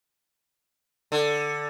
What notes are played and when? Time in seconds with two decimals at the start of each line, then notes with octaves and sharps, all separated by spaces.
1.12 D3